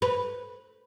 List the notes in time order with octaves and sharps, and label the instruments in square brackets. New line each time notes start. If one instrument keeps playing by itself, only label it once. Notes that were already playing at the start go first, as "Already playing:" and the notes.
[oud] B4